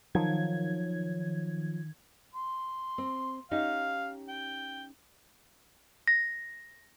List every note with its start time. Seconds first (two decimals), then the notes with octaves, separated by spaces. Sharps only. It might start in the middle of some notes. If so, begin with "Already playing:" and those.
0.15 D#3 F3 F#3 G#6
2.34 C6
2.98 C4
3.51 C#4 D#4 G4 F5
4.28 G5
6.08 A#6